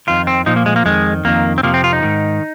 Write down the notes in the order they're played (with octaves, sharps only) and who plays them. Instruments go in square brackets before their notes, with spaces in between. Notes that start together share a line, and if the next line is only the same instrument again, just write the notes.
[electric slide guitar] F2 D#3 F4
C4
A#2 F3 D#4
A#3
G#3
A#3
F2 D#3 G#3
F2 D#3 A#3
C4
F2 C3 F3 A#3
C4
F4
D#4
G#2 D#3